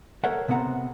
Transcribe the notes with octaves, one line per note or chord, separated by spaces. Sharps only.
A4 A#4 C#5 E5 F#5
C3 B3 C4 F#5 A#5